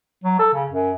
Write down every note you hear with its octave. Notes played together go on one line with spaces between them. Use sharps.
F#3
A4
C#3
F#2